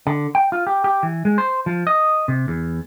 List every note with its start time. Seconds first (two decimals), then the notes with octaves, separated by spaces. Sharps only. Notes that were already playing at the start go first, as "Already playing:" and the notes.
0.07 D3
0.35 G5
0.52 F4
0.67 G4
0.84 G4
1.03 E3
1.25 G#3
1.38 C5
1.66 F3
1.87 D#5
2.28 C3
2.48 E2